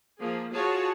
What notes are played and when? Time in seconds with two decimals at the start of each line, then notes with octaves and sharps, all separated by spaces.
0.21 F3 A#3 G#4
0.53 F4 F#4 G#4 C#5 A5